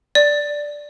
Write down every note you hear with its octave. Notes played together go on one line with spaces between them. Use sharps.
D5